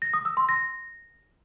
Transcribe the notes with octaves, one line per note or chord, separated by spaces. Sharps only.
A#6
D#6
E6
C6
A#6